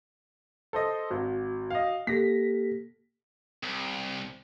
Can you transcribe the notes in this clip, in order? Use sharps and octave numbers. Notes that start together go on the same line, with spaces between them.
A4 C5 D#5
G#1 F#4
D#5 F5
A#3 G4 A4 A#6 B6
C2